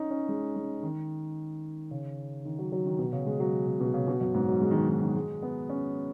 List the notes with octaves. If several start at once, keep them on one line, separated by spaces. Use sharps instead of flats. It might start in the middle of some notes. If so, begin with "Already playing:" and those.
Already playing: C#4 D#4
C#4
G#3
G#3
D#3
C#3
D#3
F#3
F#3
D#3
B2
C#3
G#3
F#3
C#3
B2
C#3
B2
F#2
G#2
F#3
G#3
D#3
F#3
D#3
D#3
G#3
B3
C#4